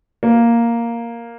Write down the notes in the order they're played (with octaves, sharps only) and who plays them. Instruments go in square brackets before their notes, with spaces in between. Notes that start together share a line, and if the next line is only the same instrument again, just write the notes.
[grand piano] A#3